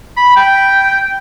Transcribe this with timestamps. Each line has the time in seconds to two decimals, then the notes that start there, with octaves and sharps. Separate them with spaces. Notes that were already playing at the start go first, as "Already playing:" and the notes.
0.17 B5
0.36 G5